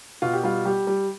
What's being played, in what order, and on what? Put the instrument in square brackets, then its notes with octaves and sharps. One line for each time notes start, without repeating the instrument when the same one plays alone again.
[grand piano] B2 F4
G4
G3 F4
G3 G4
G3